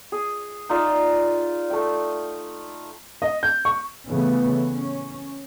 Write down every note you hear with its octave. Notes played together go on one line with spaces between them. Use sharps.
G#4
D#4 F4 D5 E5
A3 G5
D#5
G6
C#6
C#3 E3 A3 B3
C#4